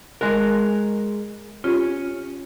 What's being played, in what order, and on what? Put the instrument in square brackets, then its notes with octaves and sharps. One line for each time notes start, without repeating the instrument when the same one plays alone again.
[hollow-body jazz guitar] G#3 A#4 [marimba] F#6
[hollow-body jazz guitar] C#4 [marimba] F4 G4